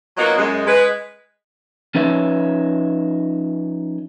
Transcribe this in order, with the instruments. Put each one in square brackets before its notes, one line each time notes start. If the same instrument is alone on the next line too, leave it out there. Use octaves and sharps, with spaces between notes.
[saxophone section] F#3 A#3 B3 D#4 F4 F#4
F#2 G#3
G#3 B4
[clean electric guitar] F3 C#4 D#4 B4 C#5 E5